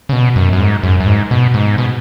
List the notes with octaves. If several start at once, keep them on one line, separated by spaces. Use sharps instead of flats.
C#3
B2
F#2
F#2
G#2
F#2
F#2
G#2
B2
G#2
B2